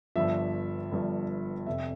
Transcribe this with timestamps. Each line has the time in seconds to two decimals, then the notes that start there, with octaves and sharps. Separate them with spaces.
0.16 G1 G2 F3 E5
0.92 G1 G2 F3
1.66 F1 F2 C3 E5